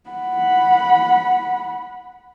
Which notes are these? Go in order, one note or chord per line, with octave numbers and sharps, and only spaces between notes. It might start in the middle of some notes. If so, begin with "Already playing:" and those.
F#5 B5